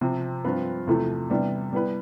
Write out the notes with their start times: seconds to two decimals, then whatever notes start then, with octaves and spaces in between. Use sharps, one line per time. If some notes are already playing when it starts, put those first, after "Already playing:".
0.01 C3 F3 C4
0.44 G2 F3 C4 F4 B4
0.87 E2 C3 F3 A3 E4
1.30 C3 E3 G3 B3 D4
1.73 G3 B3 E4 B4